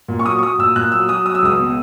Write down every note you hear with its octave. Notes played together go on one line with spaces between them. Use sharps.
A#2
C#6
F#3 D#6
C#6
F#3 D#6
A#2 E6
A#2 F#6
F#3 E6
F#3 D#6
F#3 D#6
E6
C#2 D#6
B2